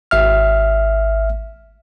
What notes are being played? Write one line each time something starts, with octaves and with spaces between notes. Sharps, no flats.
G#1 E5 F6